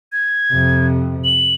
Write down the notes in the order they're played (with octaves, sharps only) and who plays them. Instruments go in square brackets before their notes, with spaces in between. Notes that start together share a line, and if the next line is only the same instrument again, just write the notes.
[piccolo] G#6
[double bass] F2 C3
[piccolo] F#7